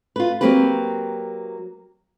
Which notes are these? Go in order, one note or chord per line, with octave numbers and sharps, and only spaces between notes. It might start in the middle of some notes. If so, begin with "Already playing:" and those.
F4 B4
F#3 A#3 C4 G4 B4